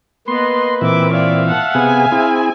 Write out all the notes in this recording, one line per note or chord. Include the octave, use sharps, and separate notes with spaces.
A#3 B3 B4 D#5 C6
A#2 E3 C4 E5 D6
C#5 D5 E5 F5
F#5 A5
C3 B3 G#4 G#5
C4 E4 G#4